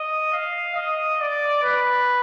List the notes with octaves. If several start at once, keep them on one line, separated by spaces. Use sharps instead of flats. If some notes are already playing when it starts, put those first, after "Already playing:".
Already playing: D#5
F5
D#5
D5
B4